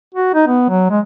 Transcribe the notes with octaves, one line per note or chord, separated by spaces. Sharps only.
F#4
D#4
B3
F#3
G#3